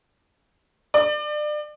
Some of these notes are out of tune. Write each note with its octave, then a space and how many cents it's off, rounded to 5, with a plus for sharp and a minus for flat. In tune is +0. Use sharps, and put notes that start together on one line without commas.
D5 +30